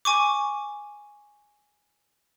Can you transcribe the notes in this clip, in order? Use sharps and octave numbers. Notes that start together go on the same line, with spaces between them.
G#5 C#6 D6